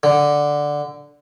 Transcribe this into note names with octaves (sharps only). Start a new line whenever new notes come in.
D3